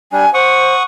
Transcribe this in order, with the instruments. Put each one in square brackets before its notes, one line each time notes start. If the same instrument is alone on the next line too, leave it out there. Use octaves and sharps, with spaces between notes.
[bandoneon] G3 D4 [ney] G#5
[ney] C5 [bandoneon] F#5 C#6 D#6